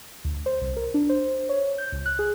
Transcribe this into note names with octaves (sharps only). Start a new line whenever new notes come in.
D2
C5
C2
A#4
D4
C5
C#5
G6
C#2
F#6
G#4